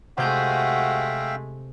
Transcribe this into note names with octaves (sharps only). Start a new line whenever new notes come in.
C3 G#3 A3 F#4 E5 F5 G5 G6